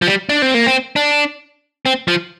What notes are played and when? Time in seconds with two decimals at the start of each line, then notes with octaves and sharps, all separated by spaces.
0.02 F3
0.07 G3
0.29 D4
0.42 C4
0.54 A#3
0.67 C4
0.96 D4
1.86 C4
2.08 F3